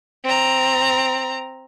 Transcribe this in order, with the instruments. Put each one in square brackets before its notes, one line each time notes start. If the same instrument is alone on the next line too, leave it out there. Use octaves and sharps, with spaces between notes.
[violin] C4 A#5